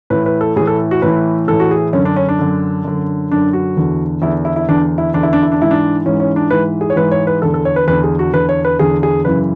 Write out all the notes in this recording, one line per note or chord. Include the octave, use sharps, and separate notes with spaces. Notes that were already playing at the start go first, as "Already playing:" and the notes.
A2 E3 B4
B4
A4
A2 E3 G#4
A4
F#4
A2 E3 B4
A2 E3 A4
F#4
G#4
F#2 D3 C#4
D4
C#4
D4
F#2 D3
F#2 D3
F#2 D3 D4
F#4
E2 D3
E2 D3 E4
E4
E4
E2 D3 D4
E4
E2 D3 D4
E4
D4
E4
D4
G#2 E3 E4
D4
G#2 E3 C#4
C#4
D4
G#2 E3 B4
G#4
C#5
G#2 E3 B4
C#5
B4
E2 D3 A4
A4
C#5
B4
E2 D3 B4
G#4
F#4
E2 D3 B4
C#5
B4
E2 D3 G#4
G#4
F#2 C#3 E3 B4